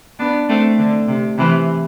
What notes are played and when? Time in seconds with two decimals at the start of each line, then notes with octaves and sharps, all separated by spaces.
0.19 B3 D4
0.49 A3 C4
0.79 D3
1.08 C3
1.38 C3 E3